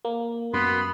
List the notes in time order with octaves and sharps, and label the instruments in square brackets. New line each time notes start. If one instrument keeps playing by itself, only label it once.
[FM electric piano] A#3
[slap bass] F#2 [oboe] B3 [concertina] B5 C6